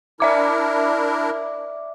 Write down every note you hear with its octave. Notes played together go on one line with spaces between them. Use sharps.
D4 E4 A#4 D5 E5 D6